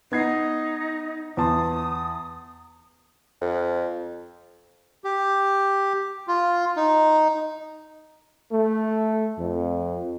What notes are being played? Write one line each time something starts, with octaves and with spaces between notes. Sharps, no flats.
B3 D#4 G#6 C7
E2 A5 C6 D#6
F2
G4
F4
D#4
A3
F2